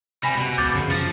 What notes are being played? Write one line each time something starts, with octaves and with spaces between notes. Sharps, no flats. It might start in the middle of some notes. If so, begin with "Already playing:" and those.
C3 G3 G#5 B5 A#6
B2
C#2 D6 G6 A6
F#2 C#3 C#7
F3 A6